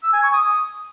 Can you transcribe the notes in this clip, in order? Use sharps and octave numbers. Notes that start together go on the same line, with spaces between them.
E6
G#5
C#6
D#6